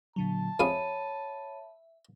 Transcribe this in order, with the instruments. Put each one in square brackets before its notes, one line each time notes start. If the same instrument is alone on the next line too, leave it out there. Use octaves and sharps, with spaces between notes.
[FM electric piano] A#2 D3 F#3 [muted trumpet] A5
[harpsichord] F2 G#4 F5 [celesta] C#5 B5 D#7 [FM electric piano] E5